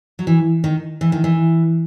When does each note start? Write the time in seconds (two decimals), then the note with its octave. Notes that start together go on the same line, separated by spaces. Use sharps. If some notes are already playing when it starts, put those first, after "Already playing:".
0.19 F#3
0.27 E3
0.64 D#3
1.01 E3
1.12 D#3
1.24 E3